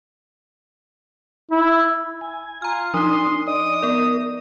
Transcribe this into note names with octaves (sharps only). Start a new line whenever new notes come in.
E4
G#5
F4 A#5 F6
F3 D4 D#4 C6 D#6
D5 D#5 D#6
B3 A#4 D5